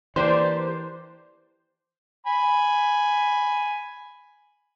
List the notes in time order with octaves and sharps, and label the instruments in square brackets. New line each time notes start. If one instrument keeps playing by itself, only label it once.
[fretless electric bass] E3 [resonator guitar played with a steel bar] A#3 D4 G4 [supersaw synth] C5 [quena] D5
[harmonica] G#5 B5